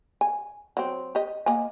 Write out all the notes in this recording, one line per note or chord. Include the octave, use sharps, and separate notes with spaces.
G#5
F#3 C4
G4 D#5
A#3 D#5 G#5